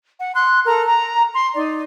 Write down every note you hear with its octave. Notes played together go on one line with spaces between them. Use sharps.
F#5
C6 F#6
A4 A#4 A#5
A#5
C6
D#4 D5